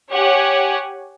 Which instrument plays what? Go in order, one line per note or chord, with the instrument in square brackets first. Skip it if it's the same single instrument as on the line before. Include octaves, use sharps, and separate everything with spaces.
[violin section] G4 C#5 F#5 G#5